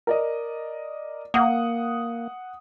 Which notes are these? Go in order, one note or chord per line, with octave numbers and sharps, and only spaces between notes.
A#4 D5 D#5
A#3 F#5 D#6